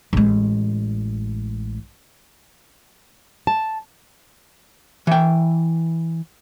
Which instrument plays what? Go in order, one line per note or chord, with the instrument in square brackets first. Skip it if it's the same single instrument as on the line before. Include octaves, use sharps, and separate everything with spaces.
[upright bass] A1 G#3
[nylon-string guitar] A5
[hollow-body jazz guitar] E3 G5